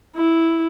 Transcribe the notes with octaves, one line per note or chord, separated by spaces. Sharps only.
E4